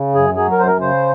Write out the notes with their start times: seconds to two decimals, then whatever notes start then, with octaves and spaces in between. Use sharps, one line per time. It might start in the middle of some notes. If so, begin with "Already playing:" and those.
Already playing: C#3
0.15 F#2 G#4
0.37 F#3 G#4
0.52 A#4
0.58 F#2 C5
0.67 A#4
0.81 C#3 C5